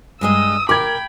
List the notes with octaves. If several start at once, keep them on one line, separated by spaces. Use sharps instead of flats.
G2 G#3 D#5 D#6 E6
A#4 G5 B5 D6 G#6